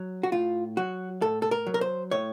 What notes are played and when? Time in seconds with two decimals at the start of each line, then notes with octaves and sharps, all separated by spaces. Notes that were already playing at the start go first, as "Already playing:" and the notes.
Already playing: F#3
0.23 F#4
0.32 A2 F4
0.77 F#3 F#4
1.22 A2 A4
1.42 A4
1.51 A#4
1.67 F#3
1.74 A#4
1.81 C5
2.11 A2 C#5